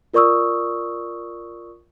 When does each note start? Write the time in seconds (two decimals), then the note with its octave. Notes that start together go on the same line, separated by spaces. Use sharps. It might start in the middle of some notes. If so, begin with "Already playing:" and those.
0.14 F4 A#4 D5 C#6 D#6 E6